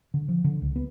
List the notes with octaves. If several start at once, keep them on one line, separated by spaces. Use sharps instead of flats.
D3
F3
D3
C#2
B3